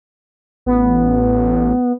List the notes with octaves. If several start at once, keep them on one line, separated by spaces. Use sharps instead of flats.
A1 B3